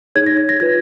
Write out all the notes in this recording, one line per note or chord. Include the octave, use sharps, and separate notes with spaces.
D#4 G#4 C#5 G#6
A#6
G#6
A#6
F4 B4 G#6